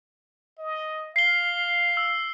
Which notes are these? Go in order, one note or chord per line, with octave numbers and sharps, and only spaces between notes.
D#5
F5 C7 G7
E6